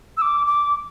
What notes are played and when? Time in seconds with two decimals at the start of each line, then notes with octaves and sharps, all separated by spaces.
0.17 E6
0.22 D6
0.47 D6